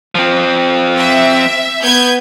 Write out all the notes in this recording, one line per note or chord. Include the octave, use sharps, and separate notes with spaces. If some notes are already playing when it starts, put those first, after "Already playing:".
F3 C4
E5
B3 G6 G#6